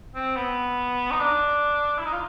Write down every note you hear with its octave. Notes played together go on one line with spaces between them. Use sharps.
C4
B3
D#4
D4
E4
D#4
F4